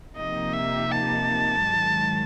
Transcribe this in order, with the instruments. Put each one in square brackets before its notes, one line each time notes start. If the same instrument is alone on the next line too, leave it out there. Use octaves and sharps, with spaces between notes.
[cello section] C3 F3 A#3 D#4 G4 [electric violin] D#5
[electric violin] E5
A5
[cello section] G#2 D#3 F#3